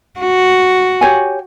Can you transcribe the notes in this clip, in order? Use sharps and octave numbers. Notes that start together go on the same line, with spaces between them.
F#4
G4 C#5 G#5